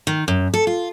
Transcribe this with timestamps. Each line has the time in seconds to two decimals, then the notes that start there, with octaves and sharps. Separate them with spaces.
0.07 D#3
0.28 F#2
0.54 A4
0.67 F4